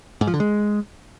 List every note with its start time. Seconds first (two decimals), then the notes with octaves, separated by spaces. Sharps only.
0.21 G#2
0.27 F3
0.34 D3
0.40 G#3